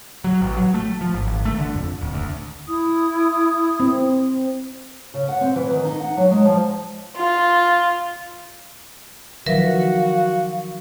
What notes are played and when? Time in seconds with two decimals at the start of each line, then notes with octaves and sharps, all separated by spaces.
0.24 F#3
0.41 A1
0.57 F#3
0.74 A3
1.01 F3
1.14 G#1
1.27 G#1
1.45 A3
1.58 D3
1.75 F2
2.01 D1
2.14 D2
2.67 E4 D#6
3.80 C4
5.14 C#3
5.28 F#5
5.41 C4
5.56 E3
5.71 D#3
5.85 D#4
6.00 F#5
6.17 F#3
6.31 G#3
6.45 F3
7.15 F4
9.46 D#3 F3 F#3 F#4 A#4 B4 E5 F5